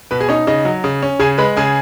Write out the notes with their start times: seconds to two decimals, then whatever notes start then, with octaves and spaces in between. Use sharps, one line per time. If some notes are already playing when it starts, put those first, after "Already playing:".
0.11 B2 B4 B5
0.20 G#4 G#5
0.28 C#4 D#4 C#5
0.47 C#3 D#4 D#5
0.65 F#3
0.84 C#3
1.02 C#4
1.20 C#3 G#4 G#5
1.38 G#3 B4 B5
1.57 C#3 G#4 G#5